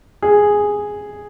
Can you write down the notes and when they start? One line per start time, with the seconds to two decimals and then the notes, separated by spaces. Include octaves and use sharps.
0.22 G#4